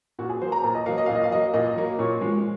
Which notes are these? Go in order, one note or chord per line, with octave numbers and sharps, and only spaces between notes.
A#2 F#4
G#4
F#3 A#3 C5
A#5
A#2 A#5
D#5
F#3 A#3 F5
D#5
A#2 F5
D#5
F5
F#3 A#3 D#5
A#2 D#5
F#3 A#3
A#2 C#5
F3 G#3